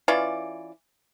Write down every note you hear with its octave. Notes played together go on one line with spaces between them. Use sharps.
E3 C#4 F4 D5